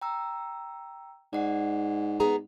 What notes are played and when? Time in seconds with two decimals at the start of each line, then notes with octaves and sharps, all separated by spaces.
0.01 G5 A#5 E6
1.33 G#2 D5 F#5 C7
2.20 B3 G#4 A#5